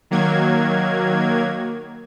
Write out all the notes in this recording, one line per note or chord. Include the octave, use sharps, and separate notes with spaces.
D#3 F#3 A#3 G#6